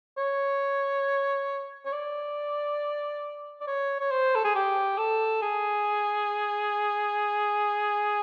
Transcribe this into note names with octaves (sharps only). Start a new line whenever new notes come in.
C#5
C#5
D5
D5
C#5
C#5
C5
A4
G#4
G4
A4
G#4